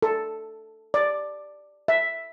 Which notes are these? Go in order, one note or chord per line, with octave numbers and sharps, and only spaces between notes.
A4
D5
E5